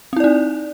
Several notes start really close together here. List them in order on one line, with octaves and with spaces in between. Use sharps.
C4 E4 D5 D#4